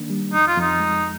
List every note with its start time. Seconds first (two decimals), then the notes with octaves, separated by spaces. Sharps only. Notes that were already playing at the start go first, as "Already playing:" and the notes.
Already playing: D#3 A#3 D4
0.10 G3
0.34 F2 D#4
0.48 F4
0.57 F2 D#4
0.80 G#3